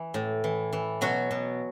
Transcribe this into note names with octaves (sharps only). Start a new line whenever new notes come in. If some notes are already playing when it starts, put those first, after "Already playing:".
Already playing: E3
A2
E3
E3
B2 F#3 F#4
B2